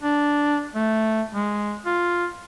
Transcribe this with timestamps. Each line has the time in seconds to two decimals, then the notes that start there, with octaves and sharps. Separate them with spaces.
0.02 D4
0.75 A3
1.33 G#3
1.85 F4